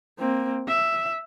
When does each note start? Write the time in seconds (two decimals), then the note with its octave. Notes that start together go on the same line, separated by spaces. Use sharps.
0.19 A#3 C4
0.68 E5